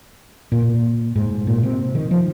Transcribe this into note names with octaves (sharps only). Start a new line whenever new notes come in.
A#2
G#2
A#2
C3
D#3
F3